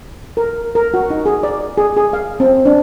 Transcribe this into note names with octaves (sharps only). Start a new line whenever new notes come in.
A#4
A#4
F#4
D#4
G#4
D5
G#4
G#4
F5
C4
D4